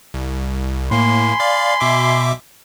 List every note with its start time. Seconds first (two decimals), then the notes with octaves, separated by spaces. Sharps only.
0.14 C2
0.91 A2 A#3 G#5 B5 C6
1.40 D5 F5
1.80 B2 E5 D6